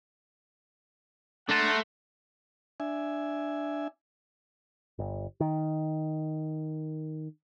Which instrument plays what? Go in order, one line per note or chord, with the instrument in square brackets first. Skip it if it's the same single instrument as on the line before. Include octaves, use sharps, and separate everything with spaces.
[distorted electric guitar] A3 [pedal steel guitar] D4 A5 [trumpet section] F#5 A#5 C6
[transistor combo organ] D4 E5 G#5
[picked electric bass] G1
D#3